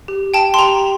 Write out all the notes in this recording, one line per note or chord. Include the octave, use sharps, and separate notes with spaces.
G4
G5 A5
C6
G4 A#5